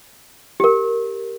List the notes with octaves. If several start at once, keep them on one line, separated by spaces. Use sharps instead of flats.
G4 A#4